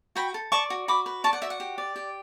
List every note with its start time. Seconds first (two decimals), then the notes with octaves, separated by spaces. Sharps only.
0.15 F#4 G5 B5
0.34 A4
0.52 D5 A5 C#6
0.70 F#4
0.88 F#4 B5 D6
1.06 B4
1.24 D5 A5 C#6
1.33 F#5
1.42 F#4 E5
1.50 F#5
1.60 G4
1.78 D5
1.96 G4